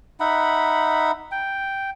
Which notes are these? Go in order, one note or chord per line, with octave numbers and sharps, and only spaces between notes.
D#4 E5 F#5 B5
G5